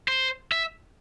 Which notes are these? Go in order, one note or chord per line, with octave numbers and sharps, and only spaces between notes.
C5
E5